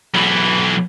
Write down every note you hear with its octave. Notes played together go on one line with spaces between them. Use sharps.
B1 E3